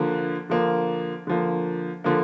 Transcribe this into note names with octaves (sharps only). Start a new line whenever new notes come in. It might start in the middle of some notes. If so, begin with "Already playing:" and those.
Already playing: D3 F3 A#3
D3 F3 A#3
D3 F3 A#3
D3 F3 A#3